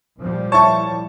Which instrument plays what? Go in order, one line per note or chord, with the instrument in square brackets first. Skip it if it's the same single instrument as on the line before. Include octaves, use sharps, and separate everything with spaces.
[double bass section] A#2 F3 G3
[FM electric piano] E4 C#5 [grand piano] A5 C#6